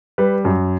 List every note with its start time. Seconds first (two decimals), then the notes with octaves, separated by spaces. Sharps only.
0.18 G3 B4
0.45 F#2